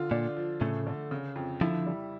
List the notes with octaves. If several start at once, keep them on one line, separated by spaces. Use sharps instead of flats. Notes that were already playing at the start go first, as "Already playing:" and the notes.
Already playing: D3 F4
A#2 D4
F3
A2 C#3 A3
D3
C#3
F2
D3 F3 E4
G3